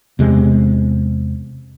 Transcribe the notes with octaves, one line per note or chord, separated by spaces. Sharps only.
E2 C3 G#3